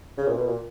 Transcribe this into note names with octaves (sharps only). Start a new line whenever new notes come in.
C#3
A#2
B2
A#2